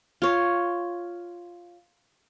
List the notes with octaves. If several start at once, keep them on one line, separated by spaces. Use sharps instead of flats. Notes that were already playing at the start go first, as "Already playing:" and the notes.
F4 C#5